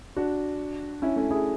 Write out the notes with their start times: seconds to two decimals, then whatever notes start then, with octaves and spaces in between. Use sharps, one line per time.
0.16 D4 F#4
1.02 C#4 E4
1.16 A3 C#4
1.30 E4 G#4